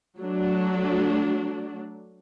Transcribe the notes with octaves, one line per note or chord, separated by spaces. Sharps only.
F#3 A3 D4